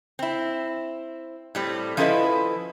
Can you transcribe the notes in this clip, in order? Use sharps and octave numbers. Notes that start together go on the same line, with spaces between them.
C4 E4
A2 G3 C4
F3 C#4 E4 A4 B4 D#5